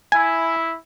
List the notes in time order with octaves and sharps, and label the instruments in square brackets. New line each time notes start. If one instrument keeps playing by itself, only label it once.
[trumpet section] E4 [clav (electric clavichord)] G#5